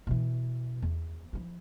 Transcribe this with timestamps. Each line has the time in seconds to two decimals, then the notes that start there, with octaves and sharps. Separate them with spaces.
0.07 B2 E3
0.82 E2
1.33 F3 E4